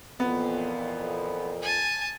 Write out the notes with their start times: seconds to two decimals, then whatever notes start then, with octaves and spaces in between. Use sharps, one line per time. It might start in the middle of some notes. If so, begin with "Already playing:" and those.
0.20 F2 A#2 E3 B3
1.62 G#5 A5